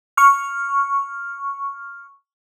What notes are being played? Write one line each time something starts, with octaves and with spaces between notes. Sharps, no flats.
C#6 F6